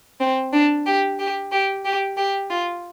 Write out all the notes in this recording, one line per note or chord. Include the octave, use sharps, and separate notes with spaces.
C4
D4
G4
G4
G4
G4
G4
F4